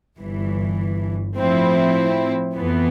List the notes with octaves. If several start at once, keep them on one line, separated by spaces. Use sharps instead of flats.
G1 G2 E3
A2 F3 C4 E4
F2 E3 B3